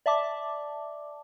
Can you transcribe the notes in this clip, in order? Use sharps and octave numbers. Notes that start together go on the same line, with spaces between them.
D5 E5 A5 D6